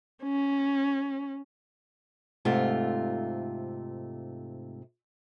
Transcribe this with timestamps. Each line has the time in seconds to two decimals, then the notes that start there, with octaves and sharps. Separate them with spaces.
0.24 C#4
2.45 G#2 C3 A3 F4